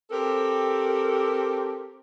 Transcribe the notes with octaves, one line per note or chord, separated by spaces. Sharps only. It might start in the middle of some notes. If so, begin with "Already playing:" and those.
C4 G4 A4 A#4